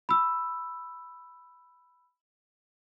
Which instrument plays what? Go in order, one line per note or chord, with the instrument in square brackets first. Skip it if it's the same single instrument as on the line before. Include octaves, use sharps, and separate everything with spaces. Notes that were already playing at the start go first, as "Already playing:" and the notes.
[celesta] B5 E6